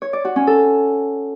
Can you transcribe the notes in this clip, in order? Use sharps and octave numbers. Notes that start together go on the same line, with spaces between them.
C#5
D5
F#4
C#4
A4